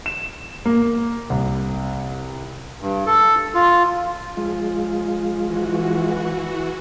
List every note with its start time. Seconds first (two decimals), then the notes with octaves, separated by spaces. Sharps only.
0.06 E7
0.65 A#3
1.30 C2
2.81 G2
3.06 A4
3.54 F4
4.37 F3 G#3 F4
5.42 E3 F#4